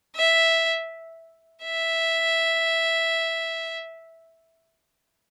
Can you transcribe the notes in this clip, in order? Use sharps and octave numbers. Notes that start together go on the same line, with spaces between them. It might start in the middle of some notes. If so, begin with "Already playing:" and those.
E5
E5